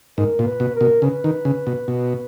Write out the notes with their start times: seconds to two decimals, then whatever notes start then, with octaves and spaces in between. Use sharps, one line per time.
0.18 G#2 A#4
0.39 A#2
0.45 B4
0.60 B2
0.75 A#4
0.81 B2
1.02 C#3 B4
1.24 D#3
1.45 C#3
1.67 B2
1.88 B2